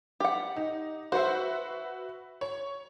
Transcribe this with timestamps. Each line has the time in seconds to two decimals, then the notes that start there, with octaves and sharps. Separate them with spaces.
0.20 G4 F#5
0.56 D#4
1.12 F#4 B4 C5 E5 F#5
2.41 C#5